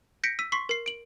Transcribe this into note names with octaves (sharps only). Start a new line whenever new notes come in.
G6 A#6 B6 C#7 D7
E6 B6 D#7
C6 C#6 B6 C7
A#4 C7
D7 F#7